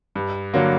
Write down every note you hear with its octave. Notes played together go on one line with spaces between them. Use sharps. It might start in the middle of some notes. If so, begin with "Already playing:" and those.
G2
D3 F#3 A#3